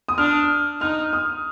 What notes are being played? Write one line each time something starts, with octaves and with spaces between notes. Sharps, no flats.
D#6
D4 F6
D#4 F6
D#6